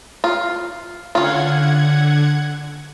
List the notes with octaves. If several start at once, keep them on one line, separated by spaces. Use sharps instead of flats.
F4
D3 C#4 F4 F#5 G#6